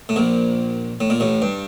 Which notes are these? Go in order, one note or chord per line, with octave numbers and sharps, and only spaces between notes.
A2
A#1 A#2
A2
A#2
A1 A2
G2